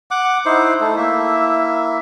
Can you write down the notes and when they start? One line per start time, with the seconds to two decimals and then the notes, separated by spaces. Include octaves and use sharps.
0.11 F#5 D6
0.46 D#4 E4 C5
0.81 A3 E4 A4
0.96 A#3 E4 E5